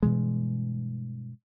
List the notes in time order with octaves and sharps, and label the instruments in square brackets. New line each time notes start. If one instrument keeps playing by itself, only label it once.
[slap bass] G2 B2 E3 G#3